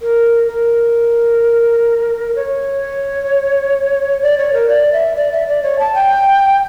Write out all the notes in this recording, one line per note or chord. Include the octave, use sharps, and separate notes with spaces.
A#4
A#4
C#5
D5
C#5
A#4
D5
E5
D5
E5
D5
C#5
A5
G5